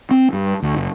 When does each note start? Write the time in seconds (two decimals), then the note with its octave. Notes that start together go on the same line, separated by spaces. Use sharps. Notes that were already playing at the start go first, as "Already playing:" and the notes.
0.11 C4
0.33 G2
0.62 D2
0.74 F#1